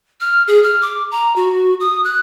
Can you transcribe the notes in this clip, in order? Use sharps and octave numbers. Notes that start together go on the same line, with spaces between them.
F6
G#4
F6
D6
A#5
F#4
D#6
F#6